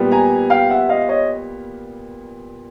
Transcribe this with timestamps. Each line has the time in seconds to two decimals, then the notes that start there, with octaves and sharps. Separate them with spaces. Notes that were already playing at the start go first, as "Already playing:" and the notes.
Already playing: A#2 G3 B3
0.11 G#5 A#5
0.50 F5 G5
0.70 E5 F#5
0.89 D#5 F5
1.09 C#5 D#5